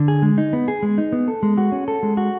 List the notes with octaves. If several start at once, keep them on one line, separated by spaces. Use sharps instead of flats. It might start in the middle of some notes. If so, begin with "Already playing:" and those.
Already playing: D3
G#4
G#3
D#4
B3
G#4
G#3
D#4
B3
A4
G#3
F#4
C#4
A4
G#3
F#4